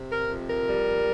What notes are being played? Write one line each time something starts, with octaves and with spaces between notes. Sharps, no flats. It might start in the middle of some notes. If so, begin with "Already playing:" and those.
Already playing: C3
A#4
F2
A#4
G3